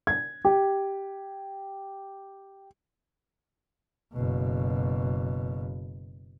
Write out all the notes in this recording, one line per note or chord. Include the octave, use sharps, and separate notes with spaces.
G#6
G4
F#1 B2